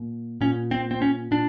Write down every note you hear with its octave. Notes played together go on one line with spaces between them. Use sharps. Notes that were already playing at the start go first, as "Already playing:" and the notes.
Already playing: A#2
A#2 C#4
C4
C4
C#4
A#2 D4